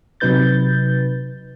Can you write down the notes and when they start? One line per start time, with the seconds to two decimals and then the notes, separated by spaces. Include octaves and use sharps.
0.20 C3 F#3 D#4 B4 G6 A6